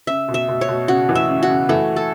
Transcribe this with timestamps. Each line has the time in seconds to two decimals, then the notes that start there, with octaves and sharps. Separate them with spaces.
0.07 C#3 E5
0.28 B2
0.34 E5
0.48 B2
0.61 C#5
0.68 B2
0.88 C#3 F#4
1.09 E3
1.15 E5
1.29 C#3
1.43 F#4
1.49 C#3
1.69 E3 A3
1.96 A4